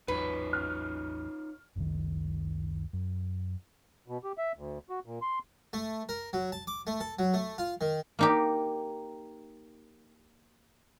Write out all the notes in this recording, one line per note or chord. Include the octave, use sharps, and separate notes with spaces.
A1 E2 F#3 D#4 F4 B4 C#5
F6 F#6
F#1 C#2 D#3
F#2
B2
G4
E5
D2
F#4
A#2
C6
A3
A#4
F#3
A5
D6
A3
A4
F#3
A3
F4
D#3
A#3 D#4 G4